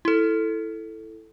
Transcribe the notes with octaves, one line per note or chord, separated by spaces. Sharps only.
E4 A4